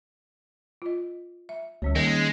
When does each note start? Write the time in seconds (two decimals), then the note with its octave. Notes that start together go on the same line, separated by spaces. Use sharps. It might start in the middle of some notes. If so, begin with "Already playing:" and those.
0.82 F4 D#5
1.49 E5
1.82 D2 G3 C#4 C#5
1.95 D#3 G3 G#3 A#3 C#4